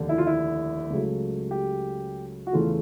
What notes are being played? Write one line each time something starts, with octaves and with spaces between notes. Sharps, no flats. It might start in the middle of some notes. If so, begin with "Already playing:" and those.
Already playing: F1 D#2 D3
E4
F4
E4
C#2 C#3 F#3 A3
G4
F#4
E2 C#3 E3 A3 F4